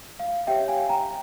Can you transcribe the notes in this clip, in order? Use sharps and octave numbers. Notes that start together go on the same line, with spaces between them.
F5
G4 C#5 E5 G5
F5 G#5
G5 A#5